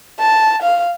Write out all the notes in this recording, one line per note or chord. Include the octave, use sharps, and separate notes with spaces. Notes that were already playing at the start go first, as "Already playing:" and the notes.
A5
F5